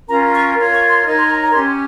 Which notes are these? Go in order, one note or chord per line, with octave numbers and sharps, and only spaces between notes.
C#4 F4 A#4 A#5
C#6
F4 A#4 C#5
C#6
C6
D#4 A#4 C#5
C6
A#5
A#5
C#4 G4 C#5 C6